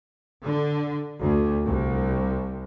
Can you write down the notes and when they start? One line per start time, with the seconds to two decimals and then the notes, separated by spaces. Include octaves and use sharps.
0.44 D3
1.19 D2
1.66 C2